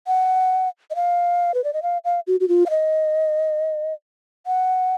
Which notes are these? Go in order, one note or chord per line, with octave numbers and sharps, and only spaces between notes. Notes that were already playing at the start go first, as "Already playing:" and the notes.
F#5
D#5
F5
B4
D5
D#5
F5
F5
F#4
F#4
F4
F5
D#5
F#5